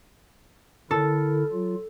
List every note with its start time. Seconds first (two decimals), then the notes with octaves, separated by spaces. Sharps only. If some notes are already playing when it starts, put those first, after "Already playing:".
0.91 D3 E4 A4 A#4
1.52 F#3 F4